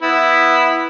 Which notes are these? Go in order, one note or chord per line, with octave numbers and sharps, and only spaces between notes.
B3 E4